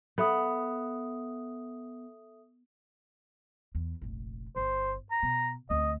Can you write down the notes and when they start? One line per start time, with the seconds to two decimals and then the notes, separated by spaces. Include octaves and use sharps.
0.18 B3 A4 E5 D#6
3.75 E2
4.01 F1 A#1
4.56 G1 C5
5.11 A#5
5.23 B2
5.70 D2 C4 D#5